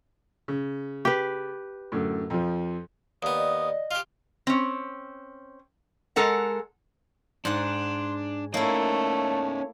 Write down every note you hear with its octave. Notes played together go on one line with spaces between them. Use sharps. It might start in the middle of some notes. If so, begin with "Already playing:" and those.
C#3
G4 B4
F#2 A2 D3
F2 F3
D#2 B3 D5 D#6
D#5
F4 G4 F6
C4 C#4
G#3 A4 A#4 F#5
G#2 D4 F#5 C6
A3 A#3 C#4 D#4 E4 C#5